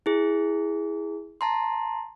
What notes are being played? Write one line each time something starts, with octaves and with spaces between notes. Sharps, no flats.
E4 G#4
A5 A#5 C6